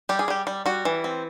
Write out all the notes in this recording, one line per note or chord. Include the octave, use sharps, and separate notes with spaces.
G3 G4
G#4
G3 G4
G3
G3 F#4
E3
C4